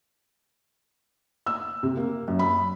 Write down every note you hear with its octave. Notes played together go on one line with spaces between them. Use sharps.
E6
C3
A#3
F#2
B5